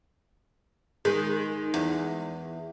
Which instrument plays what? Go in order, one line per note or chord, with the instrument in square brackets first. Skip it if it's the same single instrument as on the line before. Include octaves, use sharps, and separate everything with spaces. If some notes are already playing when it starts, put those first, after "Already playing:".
[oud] D#3 [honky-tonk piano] G#3
[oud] E2